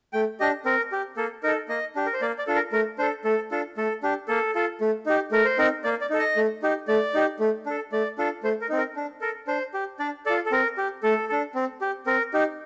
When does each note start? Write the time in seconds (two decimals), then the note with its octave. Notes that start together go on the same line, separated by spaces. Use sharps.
0.13 A3 G5
0.40 D4 G4 D#5
0.65 C4 A#4
0.92 G4
1.17 A#3 A4
1.43 D#4 A4 A#4
1.69 A#3 D#5
1.96 D4 G4
2.06 A#4
2.14 C5
2.21 A#3 D5
2.39 D5
2.47 D4 F4 A4
2.56 A#4
2.72 A3 A#4
2.99 D4 C5
3.02 A4
3.24 A3 A4
3.51 D4 F4 A4
3.77 A3 A4
4.03 D4 G4
4.28 A#3 A4
4.55 F4 A4
4.81 A3
5.06 D#4 G4
5.32 A3 A#4
5.45 C5
5.58 C4 D#4 A#4
5.84 A#3 D5
6.01 D5
6.10 D#4 A4
6.19 D#5
6.36 A3
6.62 D#4 G4
6.88 A3 D5
7.15 D#4 G4
7.39 A3
7.66 D4 A4
7.92 A3 D5
8.18 D4 F4 A4
8.43 A3 C5
8.61 A#4
8.69 C4 D#4
8.78 A#4
8.96 D4
9.21 A4 A#4
9.47 D4 C5
9.74 G4
9.99 D4 D5
10.26 A4 D5
10.30 F4
10.46 A4
10.52 C4 A#4
10.78 G4
11.03 A3 A4
11.29 D4 A4
11.55 C4
11.81 G4
12.06 C4 A#4
12.34 D#4 G4